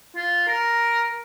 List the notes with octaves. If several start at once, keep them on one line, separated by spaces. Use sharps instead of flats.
F4
A#4